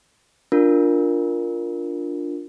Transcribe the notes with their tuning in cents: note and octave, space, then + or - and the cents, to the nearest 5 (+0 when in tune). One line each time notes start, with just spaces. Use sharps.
D4 +0 F4 +0 A#4 +0